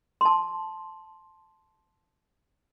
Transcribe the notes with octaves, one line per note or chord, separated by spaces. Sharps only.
A5 C6